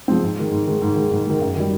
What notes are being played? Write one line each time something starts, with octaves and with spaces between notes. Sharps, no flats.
F3 G#3 C4
G#2
D#3 G#3
G#2
D#3 G#3
G#2
D#3 G#3
G#2
D#3 G#3
F#2
D#3 G3